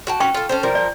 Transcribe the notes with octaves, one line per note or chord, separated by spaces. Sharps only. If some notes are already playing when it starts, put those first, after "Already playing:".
F#4 G5 A5
C#4 F#4 B4 G5 C#6
F4 A4
C#4 A4 C5
F3 G3 A#4
D5